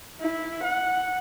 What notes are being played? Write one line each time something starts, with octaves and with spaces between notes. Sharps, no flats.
E4
F#5